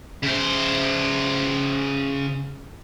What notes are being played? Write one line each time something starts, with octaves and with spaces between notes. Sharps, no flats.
C#3 C5